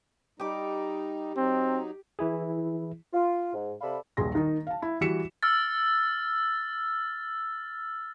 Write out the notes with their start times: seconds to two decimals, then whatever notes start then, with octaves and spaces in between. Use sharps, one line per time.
0.40 G3 D#4 G4 D6
1.37 F#3 C4 D#4
2.19 E3 E4 G#4
3.14 F4
3.54 G#2
3.81 C3 A4 D5 F5 B5
4.17 D#1 A#1 G#4 C6 A#6
4.35 D#3 D#4
4.67 F5 A5
4.82 E4
5.01 E3 G3 F#4 B6 C#7 E7
5.43 E6 F6 A6